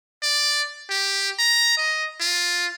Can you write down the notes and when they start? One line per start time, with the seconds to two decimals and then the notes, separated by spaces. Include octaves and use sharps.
0.23 D5
0.90 G4
1.39 A#5
1.78 D#5
2.20 F4